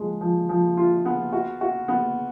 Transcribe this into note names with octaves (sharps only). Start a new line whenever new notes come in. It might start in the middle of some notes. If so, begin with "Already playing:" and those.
Already playing: F3 G#3
F3
F3
F4
B3
F#4
F#4
B3